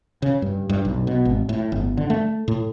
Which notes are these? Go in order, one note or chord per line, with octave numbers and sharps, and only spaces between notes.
C#3
G2
G2
B1
B2
G#1
A2
G1
D3
A3
A2